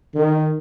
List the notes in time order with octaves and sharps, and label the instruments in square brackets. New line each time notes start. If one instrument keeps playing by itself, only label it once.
[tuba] D#3